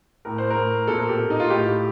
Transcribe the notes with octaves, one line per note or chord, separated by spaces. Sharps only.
A2 A#4
C5
A#4
A2
A#2 A4
A#4
G4
A#2
D#4
F4
A2 G4